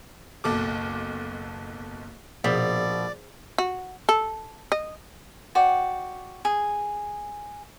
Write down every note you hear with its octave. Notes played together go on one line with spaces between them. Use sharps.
F#1 B1 A4 D6
A#1 B2 G#4 C5 D5 B6
F#4
A4
D#5
F#4 D5 G5
G#4